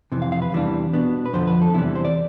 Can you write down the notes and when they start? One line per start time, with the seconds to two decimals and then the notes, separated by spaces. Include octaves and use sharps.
0.12 F2 C3 E3
0.22 F5
0.32 F5
0.42 B4
0.52 E2 C3 E3 G3 D4
0.93 B2 B3 D4
1.26 B4
1.33 F2 D3 F3 C5
1.47 B4
1.62 A4
1.74 E2 C3 E3 G3 E4
1.95 C5
2.05 D5